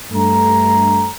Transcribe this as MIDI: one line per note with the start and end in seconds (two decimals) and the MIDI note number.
0.12 1.08 43
0.12 1.08 57
0.12 1.08 82